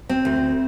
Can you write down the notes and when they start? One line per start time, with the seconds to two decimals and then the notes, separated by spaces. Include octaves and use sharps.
0.09 C4
0.25 D2